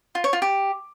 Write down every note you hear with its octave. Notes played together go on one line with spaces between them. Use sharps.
F4
C#5
F4
G4